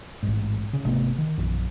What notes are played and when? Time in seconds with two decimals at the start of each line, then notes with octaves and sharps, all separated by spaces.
0.23 A1 G#2
0.73 C#3
0.85 G#1 C3 A3 B3
1.18 D#3
1.38 A#1 F#2